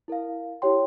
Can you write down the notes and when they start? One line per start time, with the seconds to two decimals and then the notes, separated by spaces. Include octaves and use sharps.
0.08 E4 A#4 F5
0.62 E4 G4 C#5 G5 C6